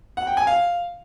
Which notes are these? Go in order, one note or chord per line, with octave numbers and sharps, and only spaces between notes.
F#5
G5
G#5
F5